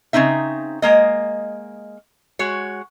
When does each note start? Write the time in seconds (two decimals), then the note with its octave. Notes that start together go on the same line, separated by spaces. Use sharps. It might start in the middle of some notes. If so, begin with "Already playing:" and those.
0.13 C#3 A#3 C4 D#4 E5
0.82 G#3 A#3 D#5
2.39 G#3 F#4 C#5